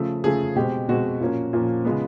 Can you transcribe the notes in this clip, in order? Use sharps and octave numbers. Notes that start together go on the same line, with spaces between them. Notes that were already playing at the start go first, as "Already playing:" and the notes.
Already playing: C#3 F3 A3
C#3 F3 A3 G#4
B2 G#3 C4 G4
B2 G#3 C4 F#4
A#2 F3 A#3 C#4
A#2 F3 A#3 C#4
C#3 F3 G#3 B3